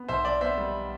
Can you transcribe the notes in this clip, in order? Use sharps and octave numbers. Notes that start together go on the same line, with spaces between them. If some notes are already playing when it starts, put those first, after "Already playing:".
Already playing: B3
B1 C5 E5
B1 D5
B3 C5 E5
G3